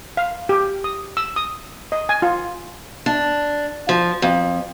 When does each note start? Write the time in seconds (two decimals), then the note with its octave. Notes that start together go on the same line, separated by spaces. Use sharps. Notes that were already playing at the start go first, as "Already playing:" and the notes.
0.17 F5
0.49 G4
0.84 D#6
1.17 E6
1.36 D#6
1.92 D#5
2.09 G#5
2.22 F4
3.06 D4
3.89 F3
4.22 F2